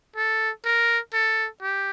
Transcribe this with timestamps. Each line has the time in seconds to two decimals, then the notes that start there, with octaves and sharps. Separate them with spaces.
0.16 A4
0.65 A#4
1.13 A4
1.62 G4